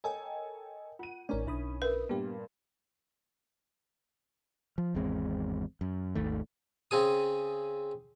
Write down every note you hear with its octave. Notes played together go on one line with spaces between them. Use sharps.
A4 A#4 C#5 D#5 G5 G#5
F4 F#5 D#7
A1 D#3 C#4 A#4 D5
B1 D4 E4 E5 B5 D#6
C#4 A#4 B4 E5
G2 A#2 B3 G4
F3
G#1 E2 G#3 C4
F#2
G#1 D#2 D#3 A3
C#3 C4 G#4 D#6